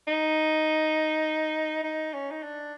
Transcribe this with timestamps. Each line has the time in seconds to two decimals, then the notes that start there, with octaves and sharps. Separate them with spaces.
0.07 D#4
1.83 D#4
2.13 C#4
2.31 D#4
2.43 D4